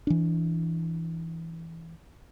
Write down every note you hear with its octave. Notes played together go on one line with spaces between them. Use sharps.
E3 D4